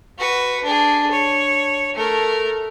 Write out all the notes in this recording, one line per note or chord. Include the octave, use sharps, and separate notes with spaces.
F#4 B4
D4 G#4
C#5
A3 A#4